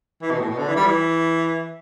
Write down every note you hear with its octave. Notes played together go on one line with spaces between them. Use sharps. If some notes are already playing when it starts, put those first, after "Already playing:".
E3
B2
A2
B2
D3
E3
G3
E3